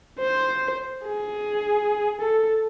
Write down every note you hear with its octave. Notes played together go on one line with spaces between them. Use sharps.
C5
G#4
A4